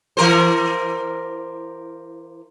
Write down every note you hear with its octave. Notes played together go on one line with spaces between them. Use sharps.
E3 A#4 C5